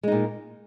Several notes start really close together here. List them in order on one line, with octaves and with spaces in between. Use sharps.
G#3 D#4 A#2